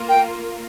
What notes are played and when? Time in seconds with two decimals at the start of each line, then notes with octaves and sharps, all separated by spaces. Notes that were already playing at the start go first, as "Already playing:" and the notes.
Already playing: A#3 F4 A#4
0.08 G5